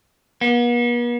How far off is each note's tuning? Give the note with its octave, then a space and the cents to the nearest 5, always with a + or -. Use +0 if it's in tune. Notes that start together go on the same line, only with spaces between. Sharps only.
B3 -45